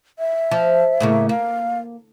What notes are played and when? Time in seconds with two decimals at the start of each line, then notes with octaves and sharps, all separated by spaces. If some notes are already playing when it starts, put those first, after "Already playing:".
0.19 E5
0.51 F3
1.00 A2 C#3 A#3
1.29 A#3 F5